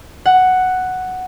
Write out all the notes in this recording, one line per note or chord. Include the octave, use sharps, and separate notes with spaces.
F#5